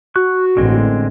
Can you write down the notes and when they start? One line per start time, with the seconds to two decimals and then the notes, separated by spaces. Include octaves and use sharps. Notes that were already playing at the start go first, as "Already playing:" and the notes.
0.16 F#4 C#6 F#6
0.57 A1 D3 G#3 C4